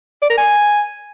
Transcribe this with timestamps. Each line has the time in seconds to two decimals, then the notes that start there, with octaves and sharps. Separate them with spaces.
0.22 D5
0.30 A#4
0.38 G#5